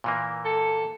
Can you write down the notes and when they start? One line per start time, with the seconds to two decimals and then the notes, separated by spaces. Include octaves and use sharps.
0.04 A#2 E3 A#3
0.45 A4